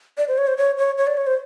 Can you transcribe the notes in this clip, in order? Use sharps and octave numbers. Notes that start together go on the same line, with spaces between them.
D5
C5
C#5
C5
C#5
C#5
C#5
D5
C#5
C5